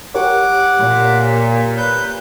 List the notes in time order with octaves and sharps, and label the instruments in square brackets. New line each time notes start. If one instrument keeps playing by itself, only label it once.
[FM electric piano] G4 A#4 C#5 [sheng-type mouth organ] F#5 D6
[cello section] A#2
[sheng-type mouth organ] B4 G6